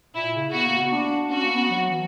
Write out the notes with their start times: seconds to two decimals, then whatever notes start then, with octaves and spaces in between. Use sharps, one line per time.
0.15 A#2 E4
0.34 C#3
0.53 B3 F#4
0.66 A#3
0.79 B3
0.92 D4
1.31 C#4 F#4
1.43 A#3
1.50 B3
1.69 F#3
1.89 E3